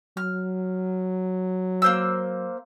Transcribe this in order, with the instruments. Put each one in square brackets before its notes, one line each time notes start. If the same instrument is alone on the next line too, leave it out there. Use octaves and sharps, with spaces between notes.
[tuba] F#3 [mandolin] F6
[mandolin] A#3 C5 E6